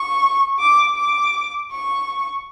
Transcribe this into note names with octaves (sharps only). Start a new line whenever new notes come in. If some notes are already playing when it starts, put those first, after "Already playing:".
Already playing: C#6
D6
D6
C#6